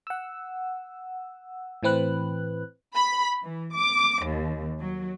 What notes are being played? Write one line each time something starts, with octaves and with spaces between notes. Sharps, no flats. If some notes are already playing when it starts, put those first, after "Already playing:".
F#5 E6
A2 E3 C4 B4 F#6
B5
E3
D6
D#2
F#3